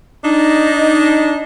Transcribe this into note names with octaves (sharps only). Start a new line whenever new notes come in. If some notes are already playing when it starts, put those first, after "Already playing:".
D4 D#4